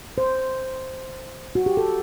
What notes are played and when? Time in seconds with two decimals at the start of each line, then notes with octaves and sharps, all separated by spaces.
0.18 C5
1.55 F#4
1.66 G4
1.77 A4